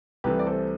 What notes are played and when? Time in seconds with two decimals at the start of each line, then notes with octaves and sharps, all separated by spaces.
0.24 C2 C3 E3 A3 G4 B4
0.39 D5
0.47 A4 C5